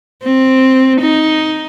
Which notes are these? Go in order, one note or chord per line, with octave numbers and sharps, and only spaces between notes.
C4
D#4